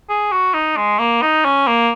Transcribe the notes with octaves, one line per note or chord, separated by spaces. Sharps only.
G#4
F#4
D#4
G#3
A#3
D#4
C#4
A#3